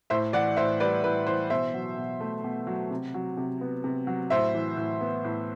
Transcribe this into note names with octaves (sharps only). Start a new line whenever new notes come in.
A2 C5 E5
E3 D5 F#5
A2 C5 E5
G3 B4 D5
A2 B4
E3 C5
B2 C5 E5
F#3
B2
A3
B2
F#3
C3
F#3
C3
B3
C3
F#3
A2 C5 E5
E3
A2
B3
A2